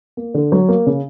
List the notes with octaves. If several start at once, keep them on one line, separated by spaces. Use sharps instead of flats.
A#3
D3
F#3
A#3
C#3